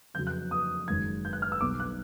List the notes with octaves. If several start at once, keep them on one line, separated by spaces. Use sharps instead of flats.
F2 C#3 F#3 G6
F#6
D#6
F#1 F#2 D#3 G#3 G#6
G6
F#6
F6
E6
B1 B2 G3 D6
F#6